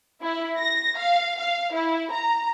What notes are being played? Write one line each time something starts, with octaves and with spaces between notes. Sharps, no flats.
E4
A#6
F5
F5
E4
A#5